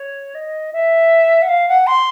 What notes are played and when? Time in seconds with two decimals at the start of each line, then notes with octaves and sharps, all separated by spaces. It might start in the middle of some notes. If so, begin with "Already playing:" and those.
Already playing: C#5
0.35 D#5
0.73 E5
1.42 F#5
1.48 F5
1.69 F#5
1.87 C6